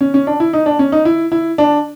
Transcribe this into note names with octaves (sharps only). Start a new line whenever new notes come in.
C#4
C#4
D4
E4
D#4
D4
C#4
D#4
E4
E4
D4